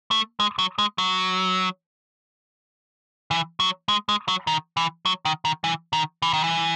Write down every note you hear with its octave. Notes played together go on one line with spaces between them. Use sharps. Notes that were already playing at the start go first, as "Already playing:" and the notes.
A3
G#3
F#3
G#3
F#3
E3
F#3
G#3
G#3
F#3
D#3
E3
F#3
D#3
D#3
E3
D#3
E3
D#3
E3